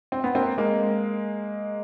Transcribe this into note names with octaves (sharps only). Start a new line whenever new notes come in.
C4
B3
A#3 C4
G#3 A#3